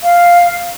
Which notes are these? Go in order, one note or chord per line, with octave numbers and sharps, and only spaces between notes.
F5